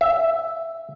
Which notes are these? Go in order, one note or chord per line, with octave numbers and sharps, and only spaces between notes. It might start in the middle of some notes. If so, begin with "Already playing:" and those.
E5